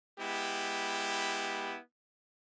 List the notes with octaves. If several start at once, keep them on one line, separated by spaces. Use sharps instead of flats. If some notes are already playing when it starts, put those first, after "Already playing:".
G#3 B3 E4 G4